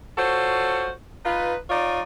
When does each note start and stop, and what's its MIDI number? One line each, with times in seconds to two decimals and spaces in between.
0.18 0.90 65
0.18 0.90 66
0.18 0.90 69
0.18 0.90 72
0.18 0.90 73
1.25 1.56 63
1.25 1.56 65
1.25 1.56 71
1.70 2.02 63
1.70 2.02 65
1.70 2.02 73
1.70 2.02 74